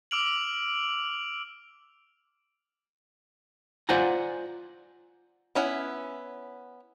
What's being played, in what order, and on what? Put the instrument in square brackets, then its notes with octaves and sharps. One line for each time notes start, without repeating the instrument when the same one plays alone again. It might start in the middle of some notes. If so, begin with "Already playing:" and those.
[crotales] D6 E6 F6 D7 F7 F#7
[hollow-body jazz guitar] F4 C5 D5 F#5 G#5 A#5
[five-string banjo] B3 C#4 E4 F#5